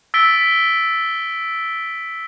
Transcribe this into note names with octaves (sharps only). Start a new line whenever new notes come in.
E6 A6 B6 D7 G7